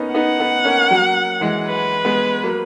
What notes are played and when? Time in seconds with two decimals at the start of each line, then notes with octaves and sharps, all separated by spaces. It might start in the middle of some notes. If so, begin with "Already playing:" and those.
Already playing: A#3 B3 C#4 D#4
0.14 B3 D#4 F#5
0.39 B3 D#4
0.65 A#3 C#4
0.91 F#3 A#3
1.41 E3 G#3
1.67 B4
2.05 G#3 B3
2.43 F#3 A#3